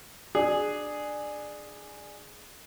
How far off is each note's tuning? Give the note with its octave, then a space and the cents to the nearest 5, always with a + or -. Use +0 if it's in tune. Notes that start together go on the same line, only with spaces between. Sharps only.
D4 +20 G#4 +0